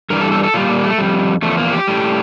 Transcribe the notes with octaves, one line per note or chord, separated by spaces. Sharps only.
G2 E3 G3 A#4
A4
A4
A4
A#2 G3 F4
A#3
A3
F2 C3 G3
E2 D3 F3 A3
A#3
F4
G4
A2 G3